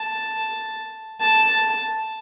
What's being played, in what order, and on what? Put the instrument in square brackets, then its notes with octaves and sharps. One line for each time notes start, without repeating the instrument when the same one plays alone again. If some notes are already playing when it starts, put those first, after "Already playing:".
Already playing: [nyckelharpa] A5
A5